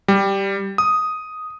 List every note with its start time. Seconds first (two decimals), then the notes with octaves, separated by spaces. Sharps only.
0.08 G3
0.78 D#6